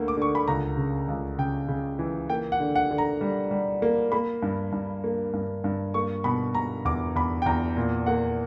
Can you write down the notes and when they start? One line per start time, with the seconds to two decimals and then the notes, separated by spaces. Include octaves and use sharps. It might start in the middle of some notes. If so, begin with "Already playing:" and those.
Already playing: D2 D3 A#3
0.08 D6
0.17 D3 C#6
0.35 B5
0.48 C#2 A#5
0.77 C#3
1.08 C#2
1.38 C#3 G5
1.68 C#3
1.99 E3
2.30 A#3 G5
2.52 F#5
2.60 D3
2.76 F#5
2.91 D3
2.98 A#5
3.21 G3
3.51 G3
3.82 A#3
4.12 A#3 B5
4.42 G2
4.72 G2
5.04 A#3
5.33 G2
5.64 G2
5.94 A#3 C#6
6.24 B2 B5
6.55 B2 A#5
6.85 E2 D6
7.16 E2 B5
7.42 G5
7.46 E2 A#5
7.77 A#2
8.06 A#3 F#5